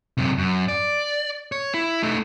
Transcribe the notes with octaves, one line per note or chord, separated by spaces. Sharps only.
F#2 C3
F#2
D5
C#5
E4
A3 D#4